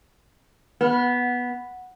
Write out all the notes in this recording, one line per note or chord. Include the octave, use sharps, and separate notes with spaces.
B3